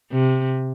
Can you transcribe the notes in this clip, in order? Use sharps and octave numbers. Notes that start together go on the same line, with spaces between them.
C3